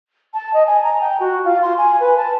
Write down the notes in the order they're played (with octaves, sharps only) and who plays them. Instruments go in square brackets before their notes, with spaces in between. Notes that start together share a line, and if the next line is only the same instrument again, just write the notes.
[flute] A5
D#5
G#5
A#5
G5
F#4
F4
C6
G#5
B4
A5